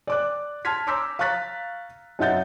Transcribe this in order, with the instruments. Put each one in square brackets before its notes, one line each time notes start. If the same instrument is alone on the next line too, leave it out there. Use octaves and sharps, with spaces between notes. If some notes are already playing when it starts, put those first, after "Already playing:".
[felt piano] D5 D6 F#6
A5 C6 F6 G#6 B6
A#5 C6 D6 E6 G6 B6
F5 A#5 C#6 F#6 A6 B6
F#2 D#4 E5 F#5 G6 A6